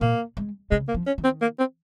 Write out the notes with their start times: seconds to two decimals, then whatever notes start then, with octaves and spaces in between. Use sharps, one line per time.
0.01 A#2 A#3
0.37 G#3
0.71 C#3 G#3
0.88 A#3
0.94 F3
1.07 C#4
1.18 D#3
1.24 C4
1.41 A#3
1.59 C4